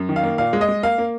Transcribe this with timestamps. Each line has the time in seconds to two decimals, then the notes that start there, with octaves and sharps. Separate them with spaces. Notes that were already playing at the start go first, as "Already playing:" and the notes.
Already playing: F#2
0.09 D#3
0.16 F5
0.23 A#3
0.38 A#2 F5
0.53 G#3
0.61 D#5
0.69 G#3
0.83 A#3 F5
0.98 A#3